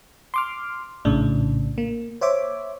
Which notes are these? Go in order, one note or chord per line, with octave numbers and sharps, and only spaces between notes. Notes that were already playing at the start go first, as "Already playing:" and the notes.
C6 D6 F6
A#1 A2 C#3 D4
A#3
C5 C#5 E5 D6